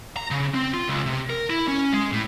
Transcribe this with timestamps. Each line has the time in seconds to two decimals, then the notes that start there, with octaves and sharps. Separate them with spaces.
0.17 A#5
0.31 C#3
0.54 C4
0.74 F4
0.88 C#2
1.06 C3
1.30 A#4
1.50 E4
1.68 C#4
1.93 G#3
2.12 A2